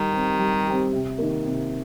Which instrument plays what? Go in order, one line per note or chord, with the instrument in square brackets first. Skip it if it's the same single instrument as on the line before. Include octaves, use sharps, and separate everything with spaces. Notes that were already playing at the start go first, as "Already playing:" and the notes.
Already playing: [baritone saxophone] D#3 [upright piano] G3
[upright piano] C4 G4
G3
C4 G4
C3
D#3 A#3
C3